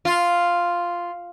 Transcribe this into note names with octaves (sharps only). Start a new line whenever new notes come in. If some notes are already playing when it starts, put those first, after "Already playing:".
F4